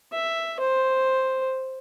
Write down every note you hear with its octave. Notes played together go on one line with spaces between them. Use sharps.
E5
C5